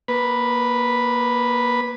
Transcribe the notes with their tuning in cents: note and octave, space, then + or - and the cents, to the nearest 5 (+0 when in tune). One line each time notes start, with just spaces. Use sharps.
A#3 +25 B4 +0